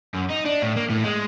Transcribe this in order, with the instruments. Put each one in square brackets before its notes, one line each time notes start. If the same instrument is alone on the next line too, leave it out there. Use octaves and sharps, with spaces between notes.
[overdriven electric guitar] F#2
D#4
D4
A2
A#3
A2
G#3